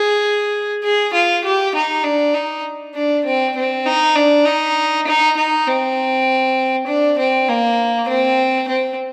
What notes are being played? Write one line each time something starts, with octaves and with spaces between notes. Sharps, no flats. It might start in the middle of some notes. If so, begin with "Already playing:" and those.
Already playing: G#4
G#4
F4
G4
D#4
D4
D#4
D4
C4
C4
D#4
D4
D#4
D#4
D#4
C4
D4
C4
A#3
C4
C4